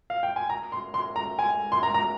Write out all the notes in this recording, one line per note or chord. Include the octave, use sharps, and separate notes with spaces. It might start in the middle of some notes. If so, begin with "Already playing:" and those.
F5
G5
G#5
A#5
C6
C6
A#5
G#5
C6
A#5
A#5